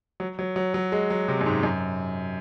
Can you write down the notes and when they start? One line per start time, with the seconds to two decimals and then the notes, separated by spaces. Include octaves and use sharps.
0.20 F#3
0.39 F#3
0.56 F#3
0.74 F#3
0.92 G#3
1.10 F#3
1.28 C3
1.41 F#2
1.46 G#2
1.63 F#2